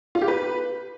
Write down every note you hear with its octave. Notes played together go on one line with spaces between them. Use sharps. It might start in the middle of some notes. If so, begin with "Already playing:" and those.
F4
G4
B4